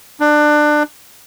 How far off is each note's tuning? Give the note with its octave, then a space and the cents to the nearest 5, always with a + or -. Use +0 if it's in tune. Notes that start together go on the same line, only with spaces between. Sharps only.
D4 +25